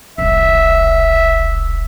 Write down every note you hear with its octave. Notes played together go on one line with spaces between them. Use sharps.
E1 C2 E5